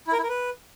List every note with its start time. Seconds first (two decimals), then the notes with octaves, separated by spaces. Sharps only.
0.07 E4
0.13 A#4
0.18 E4
0.23 A#4
0.29 B4